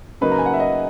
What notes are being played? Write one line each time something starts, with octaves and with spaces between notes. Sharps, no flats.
C#3 F#3 A#3 D#4 B4
A#5
G#5
F#5
E5
D#5